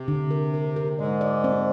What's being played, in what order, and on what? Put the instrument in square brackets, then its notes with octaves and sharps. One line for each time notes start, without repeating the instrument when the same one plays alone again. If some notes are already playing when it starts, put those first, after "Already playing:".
Already playing: [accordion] C3
[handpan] D3
A#4
A#4
A#4
[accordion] G#2 G#3 [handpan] D5
[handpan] D5
C4